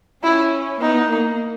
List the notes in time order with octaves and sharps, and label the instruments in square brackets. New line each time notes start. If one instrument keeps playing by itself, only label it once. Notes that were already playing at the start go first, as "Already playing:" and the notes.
[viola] C#4 [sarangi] E4
[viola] B3 [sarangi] D#4
[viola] A#3